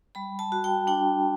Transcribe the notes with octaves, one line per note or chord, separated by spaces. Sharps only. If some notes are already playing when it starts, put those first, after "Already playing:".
G3 B5
A5
F#4
G5
D4 G5